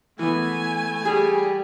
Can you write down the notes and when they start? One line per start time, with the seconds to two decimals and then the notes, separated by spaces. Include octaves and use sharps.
0.19 E3 A3 B3 G#5
1.05 G3 G#4